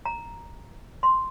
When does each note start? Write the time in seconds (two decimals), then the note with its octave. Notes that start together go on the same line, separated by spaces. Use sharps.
0.05 A#5
1.03 C6